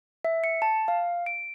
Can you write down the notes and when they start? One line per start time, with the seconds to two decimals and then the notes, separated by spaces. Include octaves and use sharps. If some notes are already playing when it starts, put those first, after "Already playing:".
0.25 E5
0.44 C#7
0.62 A5
0.88 F5
1.26 D7